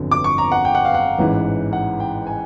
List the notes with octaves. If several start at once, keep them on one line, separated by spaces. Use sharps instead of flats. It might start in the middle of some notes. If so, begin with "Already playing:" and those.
Already playing: G1 F2 D3 F#3
D6
C#6
A#5
F#5
G5
F#5
F5
F#5
A1 G#2 E3
F#5
G5
G#5